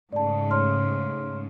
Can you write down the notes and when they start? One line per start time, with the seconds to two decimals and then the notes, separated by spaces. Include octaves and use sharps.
0.13 G#2 C#3 A3 D5 A5
0.51 C#5 C6 F6